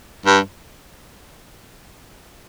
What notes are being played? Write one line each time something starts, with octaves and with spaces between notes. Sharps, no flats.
G2